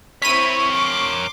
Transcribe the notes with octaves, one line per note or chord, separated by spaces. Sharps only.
C4 E4 A#4 C#5 B5 C#6 B6 D#7
C6 D6